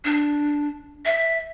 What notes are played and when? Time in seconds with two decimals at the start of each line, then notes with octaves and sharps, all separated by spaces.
0.05 D4
1.05 E5